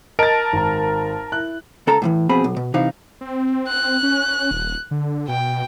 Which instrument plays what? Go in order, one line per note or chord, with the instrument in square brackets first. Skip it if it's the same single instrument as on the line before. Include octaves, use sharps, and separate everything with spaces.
[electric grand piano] A#4 A5 D7 [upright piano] D#5 A6
[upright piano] G#1 A#5
E4 F#6
[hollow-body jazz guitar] C#2 A4 A#5
A2 C3 E3
F2 B2 C4 G#4 B5
B1
B2
C3 E3 D#4 F5
[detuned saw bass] C4
[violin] F#6
[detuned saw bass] C#4
D#1
D3
[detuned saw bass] B2 [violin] G5